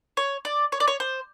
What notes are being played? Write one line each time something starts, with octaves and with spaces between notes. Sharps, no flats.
C#5
D5
C#5
D5
C#5
C5